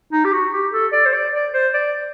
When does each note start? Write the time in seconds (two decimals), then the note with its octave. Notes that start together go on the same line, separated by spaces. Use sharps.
0.13 D#4
0.25 G4
0.33 F#4
0.53 G4
0.73 A4
0.93 D5
1.06 C5
1.13 D5
1.33 D5
1.54 C5
1.74 D5